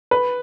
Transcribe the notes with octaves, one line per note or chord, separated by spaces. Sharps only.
B4